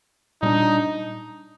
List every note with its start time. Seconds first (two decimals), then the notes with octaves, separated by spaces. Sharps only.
0.42 A#2 G3 D4 D#4